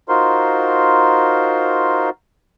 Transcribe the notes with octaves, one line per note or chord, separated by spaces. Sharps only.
D#4 F4 F#4 A#4 C5 C6